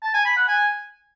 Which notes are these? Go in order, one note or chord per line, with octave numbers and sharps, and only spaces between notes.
A5
G#5
B5
F#5
G#5